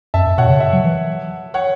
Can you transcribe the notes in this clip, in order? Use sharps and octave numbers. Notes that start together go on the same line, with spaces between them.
F#2 E5 A5
F#2
B2 C#5 F#5
C#3
E5
F#3
E3
C#5 F#5